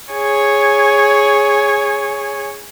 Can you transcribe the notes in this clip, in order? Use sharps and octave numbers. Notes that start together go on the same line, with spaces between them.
G#4 C#5